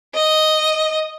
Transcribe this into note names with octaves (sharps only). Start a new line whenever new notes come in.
D#5